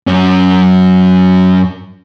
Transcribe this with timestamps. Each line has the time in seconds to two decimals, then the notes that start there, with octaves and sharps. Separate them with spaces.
0.07 F#2 C#4